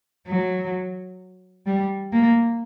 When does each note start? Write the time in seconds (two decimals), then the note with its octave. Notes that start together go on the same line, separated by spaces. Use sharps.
0.27 F#3
1.66 G3
2.12 A#3